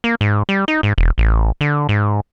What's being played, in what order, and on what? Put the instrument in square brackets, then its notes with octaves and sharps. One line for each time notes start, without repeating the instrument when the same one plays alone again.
[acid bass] A#3
G#2
G3
D#4
G#2
E1
A1
D3
G#2